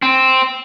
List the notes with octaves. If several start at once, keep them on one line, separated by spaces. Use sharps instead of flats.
C4